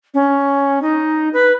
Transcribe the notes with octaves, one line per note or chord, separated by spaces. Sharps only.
C#4
D#4
B4